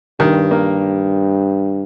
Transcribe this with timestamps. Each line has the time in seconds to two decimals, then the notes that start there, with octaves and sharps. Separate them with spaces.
0.19 G2 D#3
0.51 A#3